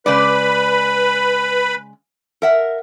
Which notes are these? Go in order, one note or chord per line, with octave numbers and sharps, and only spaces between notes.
C#3 G#3 B4 D5 B5
A#4 E5 F#5